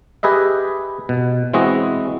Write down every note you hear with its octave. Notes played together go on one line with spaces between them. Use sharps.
G4 G#4 B4 D#5 E5
B2
E3 G#3 C4 F#4 D#5